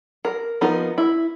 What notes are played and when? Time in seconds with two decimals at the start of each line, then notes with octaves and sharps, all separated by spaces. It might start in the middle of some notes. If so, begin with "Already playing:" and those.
0.25 A#4
0.61 F3 B3 D#4 A#4
0.98 E4